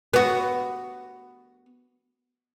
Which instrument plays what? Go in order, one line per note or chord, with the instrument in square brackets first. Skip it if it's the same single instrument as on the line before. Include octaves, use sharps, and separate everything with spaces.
[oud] B3 F#4